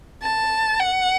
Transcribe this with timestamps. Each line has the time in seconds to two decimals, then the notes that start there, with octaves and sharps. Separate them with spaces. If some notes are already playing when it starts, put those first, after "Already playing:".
0.22 A5
0.80 F#5